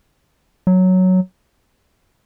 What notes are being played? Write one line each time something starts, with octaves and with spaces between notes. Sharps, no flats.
F#3